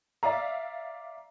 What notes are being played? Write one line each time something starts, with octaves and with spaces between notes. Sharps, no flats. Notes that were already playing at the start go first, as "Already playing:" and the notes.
D5 E5 F5 A#5